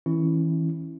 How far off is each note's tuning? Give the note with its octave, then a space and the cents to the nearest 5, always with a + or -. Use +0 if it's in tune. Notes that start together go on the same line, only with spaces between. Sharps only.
E3 -30 C#4 -25 E4 +0